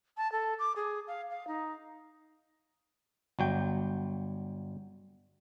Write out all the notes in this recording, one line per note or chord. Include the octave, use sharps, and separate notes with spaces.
A5
A4
D6
G#4
F5
F5
D#4
G1 F#3 G5